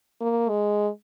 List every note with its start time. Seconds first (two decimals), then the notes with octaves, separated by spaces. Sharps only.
0.21 A#3
0.49 G#3